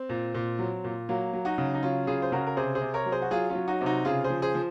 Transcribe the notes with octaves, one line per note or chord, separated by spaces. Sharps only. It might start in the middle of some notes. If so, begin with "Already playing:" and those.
Already playing: C4
A#2
A#2
F#3
A#2
F#3 A#3
F#3
D#4 F#4
C#3
D#4
F#3 C#4 F4
C#3 F4 G#4
C5
C#3 F#4 A#4
A#4
C3 G#4 C5
G#4 C5
C3
A#4 C#5
F#3
G#4 C5
F#4
F#3 F4 G#4
C#4 F4
F#3
D#4 F#4
C3
D#4 F#4
C#3 F4 G#4
G#4 C5
F3
G#4 C5
F3